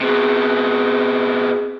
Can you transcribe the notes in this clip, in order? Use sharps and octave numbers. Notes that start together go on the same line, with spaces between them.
C3 B3 G#4